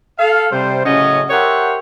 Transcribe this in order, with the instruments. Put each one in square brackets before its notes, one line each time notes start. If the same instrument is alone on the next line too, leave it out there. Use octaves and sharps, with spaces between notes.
[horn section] A4 F5
C3 G3 C5
A2 C#3 F#3 C#4 D#5
G4 A#4 C5 C#5 E5 F#5